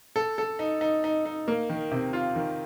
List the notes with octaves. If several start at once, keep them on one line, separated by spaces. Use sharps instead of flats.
A4
A4
D#4
D#4
D#4
D#4
A#3
D#3
C3
F4
D#3